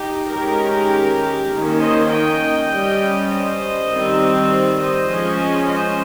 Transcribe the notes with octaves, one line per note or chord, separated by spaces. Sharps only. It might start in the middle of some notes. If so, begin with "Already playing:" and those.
Already playing: D#4 G4
D#3 G#3 C#4 G4 A#4
D#3 A#3 C#4
C5 D#5
D#5 G5
G3 C#4
C5 D#5
D#3 G3 C4
C5 D#5
F3 G#3 C#4
C5 D#5